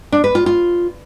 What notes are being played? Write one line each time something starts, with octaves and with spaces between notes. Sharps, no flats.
D4
B4
F4
F4